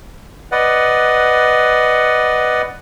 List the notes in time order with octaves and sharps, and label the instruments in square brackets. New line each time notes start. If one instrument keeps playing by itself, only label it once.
[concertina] B4 D5 D#5 F#5